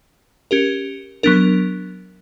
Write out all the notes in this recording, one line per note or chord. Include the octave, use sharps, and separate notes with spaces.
C#4 G4 A#4
F#3 B3 D4 A#4